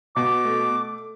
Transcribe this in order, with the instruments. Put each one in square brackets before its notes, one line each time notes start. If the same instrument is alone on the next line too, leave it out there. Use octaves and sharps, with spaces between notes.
[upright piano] B2 [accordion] D6
[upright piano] A3